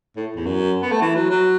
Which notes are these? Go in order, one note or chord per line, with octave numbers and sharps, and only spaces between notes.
A2
E2
F#2
B3
A3
E3
F#3
F#3